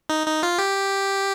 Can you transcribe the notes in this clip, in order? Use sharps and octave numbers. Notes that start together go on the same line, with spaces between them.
D#4
D#4
F4
G4